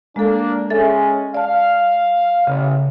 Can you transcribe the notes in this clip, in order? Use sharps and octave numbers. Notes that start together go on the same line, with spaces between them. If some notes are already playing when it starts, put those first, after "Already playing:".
G#3 A#3 D4 A4
G#3 C#4 A4 E5 A6
D5 F5 A5
A1 C#3